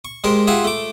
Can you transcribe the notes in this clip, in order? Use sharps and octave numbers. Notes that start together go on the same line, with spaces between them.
C#6
G#3 G4 A#4 C5
F4 G4 G#4 E5 F#5
A3 D6